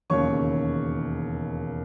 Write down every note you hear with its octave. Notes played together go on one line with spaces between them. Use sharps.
E1 D#2 C#3 C#5 C#6